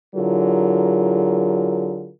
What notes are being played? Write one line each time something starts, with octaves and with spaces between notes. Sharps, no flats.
D3 F#3 E4 F4 G#4 A#4